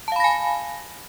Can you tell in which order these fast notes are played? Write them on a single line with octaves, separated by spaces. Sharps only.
A5 F5 B5 A#6 G#5